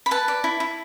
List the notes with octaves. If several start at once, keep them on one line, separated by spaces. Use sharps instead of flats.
B5
B4 A5
D5
E4
E4